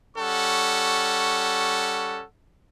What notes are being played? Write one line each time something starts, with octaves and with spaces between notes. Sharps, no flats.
G3 C#4 A4 F#5 C#6